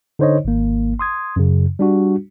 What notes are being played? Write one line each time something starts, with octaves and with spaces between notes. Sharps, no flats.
D3 D#4 C5 C#5 D#5
G#1 A#3
C6 D#6 G#6
F#2 C#3
G3 D4 F#4